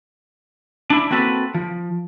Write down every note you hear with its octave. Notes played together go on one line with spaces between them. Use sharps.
D4 E4
A#3 C4 F#4 A4 B4
F3